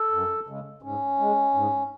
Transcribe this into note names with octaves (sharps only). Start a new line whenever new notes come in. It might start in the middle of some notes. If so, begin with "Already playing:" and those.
Already playing: A4
F#2
C#3 G#3
G#2 C#4
G#3
G#2